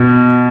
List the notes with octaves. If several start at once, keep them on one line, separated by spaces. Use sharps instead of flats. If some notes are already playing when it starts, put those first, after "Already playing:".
Already playing: B2